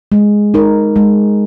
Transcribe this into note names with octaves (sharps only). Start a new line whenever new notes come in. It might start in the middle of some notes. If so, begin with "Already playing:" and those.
G#3
D#4 A#4
G#3